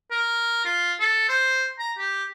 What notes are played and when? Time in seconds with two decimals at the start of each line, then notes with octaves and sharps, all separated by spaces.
0.11 A#4
0.65 F4
1.00 A4
1.29 C5
1.79 A#5
1.98 G4